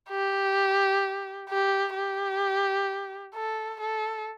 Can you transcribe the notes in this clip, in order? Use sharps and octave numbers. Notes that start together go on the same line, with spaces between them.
G4
G4
G4
A4
A4